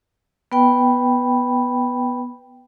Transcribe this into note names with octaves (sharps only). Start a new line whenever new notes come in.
B3 B4 G5 B5